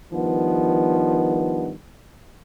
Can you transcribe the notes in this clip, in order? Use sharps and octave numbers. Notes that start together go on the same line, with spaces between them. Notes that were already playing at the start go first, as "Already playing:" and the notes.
G2 D#3 F3 B3